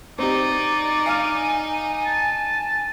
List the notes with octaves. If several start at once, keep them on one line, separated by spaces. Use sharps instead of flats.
C4 D#4 G4 D5
F5 G#5 F6
A5